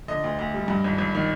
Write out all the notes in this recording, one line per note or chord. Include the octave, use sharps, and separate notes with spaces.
D3 D#5
D2
D2
G3
G2
G#1
G#1
D#3